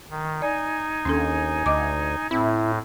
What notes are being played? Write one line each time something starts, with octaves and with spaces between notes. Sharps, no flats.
D#3
D#4 D5 G#5
D#2 C#4 D4 A4
D2 D#5 D6
A2 C4 E4